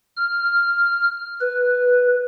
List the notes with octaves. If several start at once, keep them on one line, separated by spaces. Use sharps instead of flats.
F6
B4